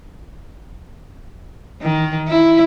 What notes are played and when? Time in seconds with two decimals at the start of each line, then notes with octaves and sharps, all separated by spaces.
1.82 D#3
2.28 E4